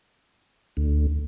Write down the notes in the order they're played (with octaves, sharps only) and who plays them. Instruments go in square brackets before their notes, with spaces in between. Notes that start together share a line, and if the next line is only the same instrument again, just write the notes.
[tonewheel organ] D2